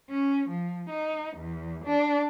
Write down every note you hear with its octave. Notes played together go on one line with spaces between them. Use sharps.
C#4
F3
D#4
E2
D4